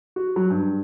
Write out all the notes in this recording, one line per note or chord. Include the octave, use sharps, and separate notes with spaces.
F#4
F#3
G2